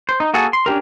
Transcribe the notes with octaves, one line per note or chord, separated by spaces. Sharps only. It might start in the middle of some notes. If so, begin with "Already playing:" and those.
C5
D#4
A#3 F#4 G#4 A4
C6
C#4 D4 G4 A#4